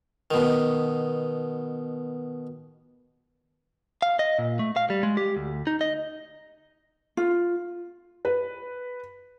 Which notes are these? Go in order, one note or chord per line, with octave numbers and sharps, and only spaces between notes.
B2 D#3
F5
D#5
A#2
A3
F5
G3
G#3
G4
D2
D#4
D#5
F4
B4